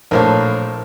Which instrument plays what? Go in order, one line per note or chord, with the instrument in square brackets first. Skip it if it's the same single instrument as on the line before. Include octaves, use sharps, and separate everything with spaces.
[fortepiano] A#1 A2 C#5 [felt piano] A#4 C5 A5